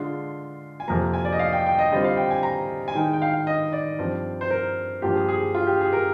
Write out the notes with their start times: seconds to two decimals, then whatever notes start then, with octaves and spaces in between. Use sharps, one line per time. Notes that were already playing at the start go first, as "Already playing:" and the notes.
Already playing: D3 G#3 D4 F4 C6
0.80 G#5
0.88 F2 C3 F3 A#3 A#5
1.14 G#5
1.25 D5
1.33 D#5
1.39 F5
1.53 G5
1.66 G5
1.79 D#5
1.91 D3 G3 C4 F4 D#5
2.04 F5
2.17 G5
2.31 G#5
2.43 A#5
2.88 G#5
2.95 D#3 G#3 D#4 G5
3.13 G5
3.22 F5
3.34 F5
3.47 D#5
3.73 D5
3.99 G2 F3 C4
4.41 C5
4.50 A#4
5.02 G2 F3 A#3 F4 G4
5.15 G#4
5.28 G#4
5.55 F4
5.67 G4
5.81 G#4
5.93 A#4